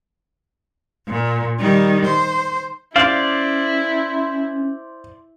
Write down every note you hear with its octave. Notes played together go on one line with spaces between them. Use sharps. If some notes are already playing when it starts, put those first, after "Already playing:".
A#2
D#3 G3
C5
C#4 E4 C5 D5 F5